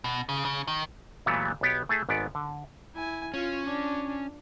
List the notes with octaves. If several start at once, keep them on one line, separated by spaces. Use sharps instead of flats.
B2
C#3
C#3
D#3
A#2 E3 F#3 G3 A3 B3
B1 B3 G4
A3 E4 G#4 A4
G#1 G#2 B3 D5
D3
E4 G#5
C#4 F4
D4